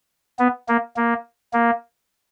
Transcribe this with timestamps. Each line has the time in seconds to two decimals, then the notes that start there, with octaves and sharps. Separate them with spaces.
0.39 B3
0.69 A#3
0.97 A#3
1.53 A#3